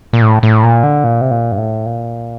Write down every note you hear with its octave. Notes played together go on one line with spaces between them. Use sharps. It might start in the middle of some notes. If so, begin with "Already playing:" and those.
A#2
A2
A2
A#2
D3
A#2
C3
A#2
G2
A2
A#2